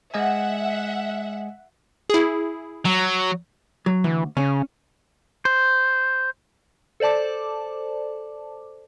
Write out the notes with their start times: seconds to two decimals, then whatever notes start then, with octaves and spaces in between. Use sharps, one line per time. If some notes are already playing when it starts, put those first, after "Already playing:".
0.14 G#3 D#5 E5 F#5 G#5
2.10 E4 G#4
2.86 F#3
3.86 F#3
4.04 D2 E3
4.37 C#3 C#4
5.45 C5
7.00 A4 C5 D5 A5 D6